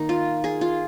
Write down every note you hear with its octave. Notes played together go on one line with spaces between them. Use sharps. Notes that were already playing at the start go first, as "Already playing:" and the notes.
Already playing: D#3 A#3 D#4
F4
G#4
F4